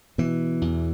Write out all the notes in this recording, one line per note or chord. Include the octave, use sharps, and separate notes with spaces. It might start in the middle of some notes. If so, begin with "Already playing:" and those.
B2 E3
E2